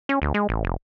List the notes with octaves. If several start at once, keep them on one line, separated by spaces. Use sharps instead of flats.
C#4
D2
G#3
A1
F1